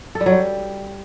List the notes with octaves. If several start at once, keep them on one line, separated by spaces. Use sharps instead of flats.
A4
G3
F#3
G3